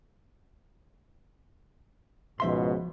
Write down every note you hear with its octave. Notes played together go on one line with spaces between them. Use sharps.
C#2 G#2 B2 F3 E5 C6